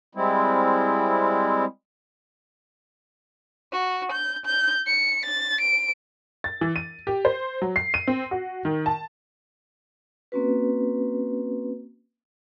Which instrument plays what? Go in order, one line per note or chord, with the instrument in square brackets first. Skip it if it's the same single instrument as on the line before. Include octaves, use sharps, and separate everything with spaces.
[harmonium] G3 G#3 C4 E4
[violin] F#4
G6
G6
C#7
A6
D7
[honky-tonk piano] A6
E3
D#7
G4
C5
F#3
C7
D#7
C4
F#4
D#3
A5
[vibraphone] A#3 C4 C#4 F#4 B4